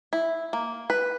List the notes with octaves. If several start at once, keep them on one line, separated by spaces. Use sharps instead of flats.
E4
A#3
B4